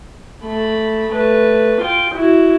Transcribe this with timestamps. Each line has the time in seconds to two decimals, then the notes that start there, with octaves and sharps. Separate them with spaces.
0.43 A3 B5
1.12 A3 B4
1.81 F4 G5
2.15 E4 F#4